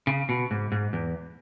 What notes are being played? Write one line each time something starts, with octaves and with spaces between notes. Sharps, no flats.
C#3
B2
G#2
G#2
E2